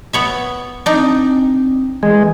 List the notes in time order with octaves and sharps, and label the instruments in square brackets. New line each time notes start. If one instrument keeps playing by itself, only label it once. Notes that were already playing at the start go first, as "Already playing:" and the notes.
[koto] B3 C#5 E5
[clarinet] C4 [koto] D4 D#4
[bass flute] E3 [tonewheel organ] G#3